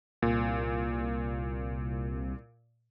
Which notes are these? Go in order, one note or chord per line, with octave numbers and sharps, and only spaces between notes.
C2 A#2